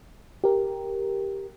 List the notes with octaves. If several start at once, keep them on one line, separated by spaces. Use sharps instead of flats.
G4 A#4